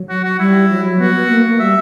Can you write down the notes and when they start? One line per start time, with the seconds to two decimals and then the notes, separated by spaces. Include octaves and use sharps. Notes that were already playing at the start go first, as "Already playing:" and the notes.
Already playing: F#3
0.09 F#4
0.24 F#4
0.38 G3 E4
0.70 F#3
0.99 B3 F#4
1.15 B3
1.30 A#3
1.45 A#3
1.60 G3 E5